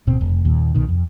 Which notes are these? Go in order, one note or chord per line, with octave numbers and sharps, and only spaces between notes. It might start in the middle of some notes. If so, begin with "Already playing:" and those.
D1 B2 C4
F1
D#2 A#2
C2 B2 D#3
F2